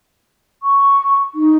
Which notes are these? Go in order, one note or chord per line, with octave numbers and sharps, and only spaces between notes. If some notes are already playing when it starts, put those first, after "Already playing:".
C#6
D#4